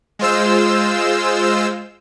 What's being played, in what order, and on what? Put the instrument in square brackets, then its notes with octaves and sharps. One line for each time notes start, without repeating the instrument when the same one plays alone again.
[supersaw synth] G#3 F4 C5 E6